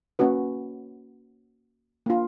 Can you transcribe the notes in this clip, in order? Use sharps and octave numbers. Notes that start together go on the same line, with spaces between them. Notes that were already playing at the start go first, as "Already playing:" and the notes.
A#3 C#4 F#4 B4
A#3 D4 F4